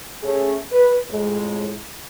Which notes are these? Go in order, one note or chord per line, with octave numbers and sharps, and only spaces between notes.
A3 C#4 G#4
B4
F2 A2 G#3